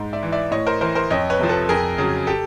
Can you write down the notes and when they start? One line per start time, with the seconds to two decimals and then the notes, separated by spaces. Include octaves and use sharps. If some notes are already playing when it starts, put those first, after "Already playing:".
Already playing: G#2
0.13 D5 E5
0.23 E3
0.32 D5 E5
0.51 A2 C#5 D#5
0.66 A#4 C5
0.81 E3 A#4 C5
0.95 A#4 C5
1.10 F2 C#5 D#5
1.30 B4 C#5
1.39 C3 F3
1.49 A4 B4
1.69 F2 G#4 A#4
1.98 C#3 F#3
2.27 G4 A4